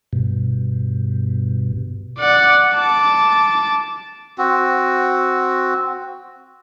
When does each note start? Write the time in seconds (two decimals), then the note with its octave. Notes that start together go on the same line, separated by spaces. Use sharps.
0.13 G2 B2
2.19 D5 F#5
2.75 A5 D6
4.38 C4 F#4